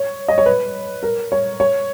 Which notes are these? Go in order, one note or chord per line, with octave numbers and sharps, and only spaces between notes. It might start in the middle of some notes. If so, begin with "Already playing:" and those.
Already playing: C#5
D#5
C#5
B4
A#4
C#5
C#5